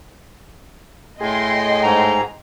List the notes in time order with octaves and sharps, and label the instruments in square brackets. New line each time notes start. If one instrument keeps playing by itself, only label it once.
[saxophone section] A2 [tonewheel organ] G#4 [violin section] D#5 G5 C6
[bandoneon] G#2 A#5